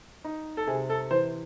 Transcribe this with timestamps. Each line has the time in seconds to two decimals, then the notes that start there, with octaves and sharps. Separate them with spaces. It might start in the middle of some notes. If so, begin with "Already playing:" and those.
0.24 D#4
0.57 A4
0.67 C3 G#4
0.90 A4
1.11 E3 C5